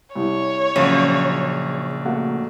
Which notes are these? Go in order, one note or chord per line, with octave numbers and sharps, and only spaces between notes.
C2 C#5
A#1 C#3 F3 F#3
A3 A#3 F#4